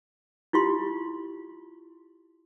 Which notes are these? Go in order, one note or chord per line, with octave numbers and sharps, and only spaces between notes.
E4 F4 G4 C6